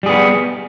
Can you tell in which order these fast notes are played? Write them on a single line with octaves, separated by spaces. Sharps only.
G3 G#4 B3